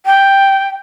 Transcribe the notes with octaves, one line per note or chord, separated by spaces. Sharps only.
G5